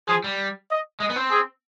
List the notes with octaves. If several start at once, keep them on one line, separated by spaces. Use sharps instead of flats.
F3 G#4
G3
D#5
G#3 D#5
B3
C4
G#4